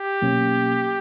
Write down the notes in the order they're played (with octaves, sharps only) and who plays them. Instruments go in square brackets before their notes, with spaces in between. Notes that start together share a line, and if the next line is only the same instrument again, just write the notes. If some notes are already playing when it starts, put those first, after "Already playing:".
Already playing: [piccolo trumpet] G4
[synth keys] B2 F#3 A#3 C#4